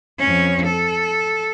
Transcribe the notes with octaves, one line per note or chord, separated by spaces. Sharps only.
F2 C#4
A4